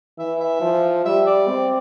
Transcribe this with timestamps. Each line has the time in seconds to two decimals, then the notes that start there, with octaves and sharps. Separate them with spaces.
0.19 E3 E5
0.40 E5
0.61 F3
1.05 G3 E5
1.27 D5
1.48 C4